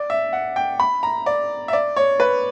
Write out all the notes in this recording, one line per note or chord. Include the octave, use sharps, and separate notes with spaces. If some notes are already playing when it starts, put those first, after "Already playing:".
Already playing: D5
E5
F#5
G5
B5
A#5
D5
E5
D5
C#5
B4